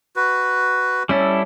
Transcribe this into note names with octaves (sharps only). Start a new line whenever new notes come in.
F#4 B4
G3 C#4 E4 A4